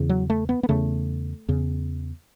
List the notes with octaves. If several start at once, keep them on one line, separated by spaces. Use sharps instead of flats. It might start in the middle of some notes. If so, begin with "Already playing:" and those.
Already playing: E2 C#3
F#3
A3
B3
B3
E2 C#3 A3
E2 C#3